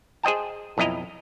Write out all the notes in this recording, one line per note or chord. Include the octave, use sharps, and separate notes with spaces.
G#4 C5 D#5 G5 A5
B1 F2 E4 D#5 A#5